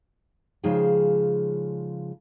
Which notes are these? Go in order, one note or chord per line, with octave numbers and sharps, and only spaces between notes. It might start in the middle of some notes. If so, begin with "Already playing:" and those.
C#3 F3 G#3 D#4 G#4 G5